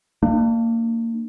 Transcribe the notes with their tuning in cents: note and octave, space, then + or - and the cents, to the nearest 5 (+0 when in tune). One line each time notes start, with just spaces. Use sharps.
A#3 -25 D4 +35